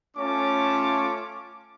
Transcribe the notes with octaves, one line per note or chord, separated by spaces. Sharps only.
A3 C#4 F4 C#5 A5 D6